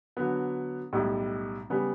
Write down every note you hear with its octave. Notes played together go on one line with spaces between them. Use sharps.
D3 F#3 B3
B1 A2 G3
C#3 G3 B3